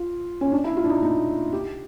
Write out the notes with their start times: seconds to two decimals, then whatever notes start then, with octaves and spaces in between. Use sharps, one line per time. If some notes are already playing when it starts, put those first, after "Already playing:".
Already playing: F4
0.41 C#4
0.52 D4
0.64 E4
0.77 F4
0.84 D4
0.90 D#4
1.03 D#4
1.53 G4